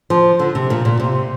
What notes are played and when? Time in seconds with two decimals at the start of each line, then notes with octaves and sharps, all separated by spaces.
0.10 F3
0.39 D3
0.55 C3
0.70 A#2
0.85 A#2
1.00 C3